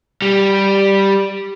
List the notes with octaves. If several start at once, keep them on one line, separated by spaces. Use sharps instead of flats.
G3